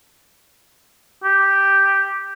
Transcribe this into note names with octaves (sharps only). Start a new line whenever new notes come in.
G4